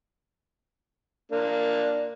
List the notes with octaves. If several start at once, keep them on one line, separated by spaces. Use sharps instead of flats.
A#3 D4